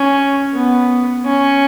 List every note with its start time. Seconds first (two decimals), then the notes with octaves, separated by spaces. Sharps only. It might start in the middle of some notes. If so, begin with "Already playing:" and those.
Already playing: C#4
0.54 B3
1.26 C#4